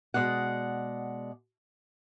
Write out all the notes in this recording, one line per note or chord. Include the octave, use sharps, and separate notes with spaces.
B2 E3 G#3 D5 F#5